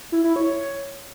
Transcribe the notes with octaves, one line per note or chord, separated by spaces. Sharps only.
E4
E4
C#5